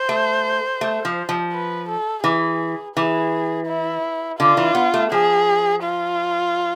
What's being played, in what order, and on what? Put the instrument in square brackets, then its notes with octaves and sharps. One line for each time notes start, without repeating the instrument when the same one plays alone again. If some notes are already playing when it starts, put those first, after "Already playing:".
Already playing: [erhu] C5
[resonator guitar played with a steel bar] A3
A3
F3
F3
[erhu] B4
A4
[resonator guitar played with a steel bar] E3 [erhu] G#4
[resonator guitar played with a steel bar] E3 [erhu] G#4
[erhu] E4
[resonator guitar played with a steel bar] D3 [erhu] F4
[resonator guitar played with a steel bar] E3
B3
A3
[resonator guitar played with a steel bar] F3 [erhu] G#4
[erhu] F4